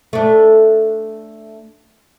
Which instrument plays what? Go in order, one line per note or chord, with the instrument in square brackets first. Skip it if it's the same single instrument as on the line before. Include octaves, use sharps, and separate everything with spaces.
[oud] A3 D4